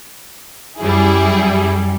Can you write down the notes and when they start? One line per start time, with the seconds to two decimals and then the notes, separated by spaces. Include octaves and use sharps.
0.79 F#2 G3 E4 G#4